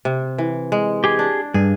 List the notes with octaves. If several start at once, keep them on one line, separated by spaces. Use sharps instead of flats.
C3
E3
G#3
G4 G#4
D4
G2 G#4